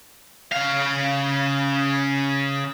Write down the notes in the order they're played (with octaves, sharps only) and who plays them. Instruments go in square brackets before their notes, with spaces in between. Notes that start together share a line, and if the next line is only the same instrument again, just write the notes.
[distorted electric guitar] C#3 F5